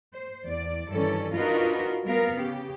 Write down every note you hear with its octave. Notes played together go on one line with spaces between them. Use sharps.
C5
E2 D5
G2 D#3 E3 C#4 A4 D5
D4 D#4 F4 F#4 A#4 B4
G3 B3 A#4 F5
C#3 G4